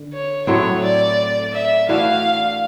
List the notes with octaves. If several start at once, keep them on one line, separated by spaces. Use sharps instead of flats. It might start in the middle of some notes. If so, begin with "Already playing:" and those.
Already playing: D3
C#5
A2 F#3 A3 C4 C#5
D5
E5
E3 A3 D4 F#4 F5